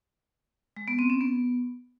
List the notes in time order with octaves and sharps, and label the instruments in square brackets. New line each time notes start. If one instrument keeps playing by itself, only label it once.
[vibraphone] G#3
B3
C4
C#4
B3